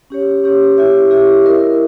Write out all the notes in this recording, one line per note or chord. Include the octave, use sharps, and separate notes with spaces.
C#4 G4 C#5
C#4 G4 C#5
E4 G4 C#5 E5
E4 G4 C#5 E5
E4 A#4 D#5